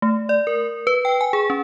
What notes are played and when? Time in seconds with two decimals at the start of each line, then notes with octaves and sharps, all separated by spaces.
0.02 A3
0.29 D5
0.47 A#4
0.87 B4
1.05 G5
1.21 G#5
1.33 G#4
1.50 C#4